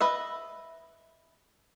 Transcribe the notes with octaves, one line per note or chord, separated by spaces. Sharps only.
B4 D#5 E5